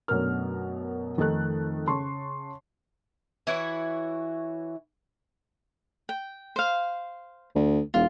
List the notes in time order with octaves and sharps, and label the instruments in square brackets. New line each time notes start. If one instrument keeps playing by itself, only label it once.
[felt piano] F#2 B2 A3 D4 A#4 F6
F2 D#3 A3 D#4 A4 F#6
C#3 A5 C6 C#6
[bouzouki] E3 E4 F#4 C#5
[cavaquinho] G5
C5 F5
[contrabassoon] D2
[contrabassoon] E1 [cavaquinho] F4